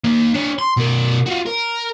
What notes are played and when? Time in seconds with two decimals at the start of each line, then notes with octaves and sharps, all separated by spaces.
0.04 D#3 A#3
0.34 D4 C#5
0.59 C6
0.77 B2 A#4
1.26 F4 F#4
1.46 A#4